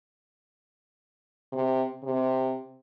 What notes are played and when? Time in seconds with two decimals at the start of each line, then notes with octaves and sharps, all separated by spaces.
1.52 C3
2.03 C3